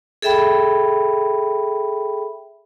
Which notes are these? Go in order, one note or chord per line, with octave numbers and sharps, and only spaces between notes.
G#4 A4 E5 G5 B5